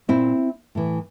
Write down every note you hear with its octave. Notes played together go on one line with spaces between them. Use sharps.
A#2 C4 E4
A2 E3